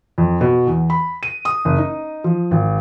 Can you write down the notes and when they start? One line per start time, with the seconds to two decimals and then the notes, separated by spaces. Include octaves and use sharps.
0.18 F2
0.41 B2
0.67 E2
0.90 B5
1.23 D#7
1.45 D#6
1.65 F#1
1.78 D#4
2.24 F3
2.51 G#1